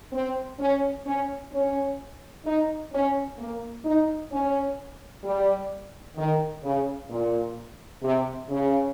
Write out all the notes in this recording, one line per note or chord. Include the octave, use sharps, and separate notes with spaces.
C4
C#4
C#4
C#4
D#4
C#4
A#3
D#4
C#4
G3
D#3
C#3
A#2
C3
C#3